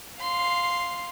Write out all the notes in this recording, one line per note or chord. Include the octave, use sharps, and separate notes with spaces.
F5 C6